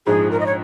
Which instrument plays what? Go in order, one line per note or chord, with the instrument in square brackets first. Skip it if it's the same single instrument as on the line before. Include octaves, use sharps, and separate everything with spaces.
[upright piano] A#1 G#2 F3 [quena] G#4
[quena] A#4
D#5
C#5